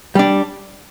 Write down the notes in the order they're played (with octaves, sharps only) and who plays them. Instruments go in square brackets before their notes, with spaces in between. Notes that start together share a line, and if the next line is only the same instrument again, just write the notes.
[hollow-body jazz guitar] G3 D4